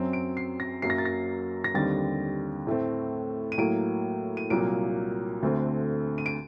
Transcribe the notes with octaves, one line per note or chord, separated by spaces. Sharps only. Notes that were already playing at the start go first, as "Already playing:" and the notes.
Already playing: F#2 F#3 C4
D7
C7
A#6
F#2 F#3 A#3 C7
A#6
A6
A#6
A#6
D#2 D3 G3 C4 A6
A2 A3 C4
D#7
A2 F#3 A#3 D7
D#7
C2 A#2 F#3 A#3 D7
D2 D3 A3 C4
D#7
D7